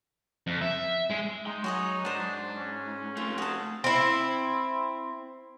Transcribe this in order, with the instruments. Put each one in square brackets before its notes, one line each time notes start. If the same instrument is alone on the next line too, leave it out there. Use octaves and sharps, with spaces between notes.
[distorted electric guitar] F2
E5
G#3
[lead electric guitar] G#3 C6 [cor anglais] D#4
[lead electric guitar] F#3 [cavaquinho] F#4 G#4 D#5 [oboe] C#5
[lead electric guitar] G#2 [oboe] D4 [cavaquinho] F#4 C5
[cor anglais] C#4
[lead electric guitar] A3 C4 [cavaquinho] F4 [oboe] C6
[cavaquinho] F#4 A5 [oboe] G#4
[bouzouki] C4 E4